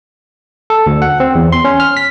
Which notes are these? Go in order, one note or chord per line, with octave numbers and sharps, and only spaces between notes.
A4
D2
F#5
C4
E2
C6
C#4
F6
B6